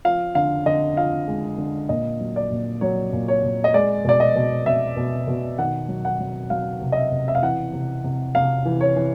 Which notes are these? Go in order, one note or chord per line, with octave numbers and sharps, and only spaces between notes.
F3 F5
D3 F5
D3 D#5
F3 F5
G#3
D3
A#2 D#5
F#3
D5
A#2
F#3 C#5
A#2
C#5
A#2
D#5
G#3 D5
B2 D5
D#5
B2
B2 E5
B2
B2
D#3 F#5
F#3
F#5
F#3
F#3 F5
C3
D#5
E5
C3
E5
F5
E3 F#5
C3
C3
C3 F5
E3
C#5
E3